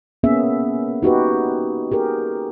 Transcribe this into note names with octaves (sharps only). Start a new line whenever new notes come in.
A#3 B3 C#4 G#4 E5
D#4 F#4 G4 B4
G4 G#4 A#4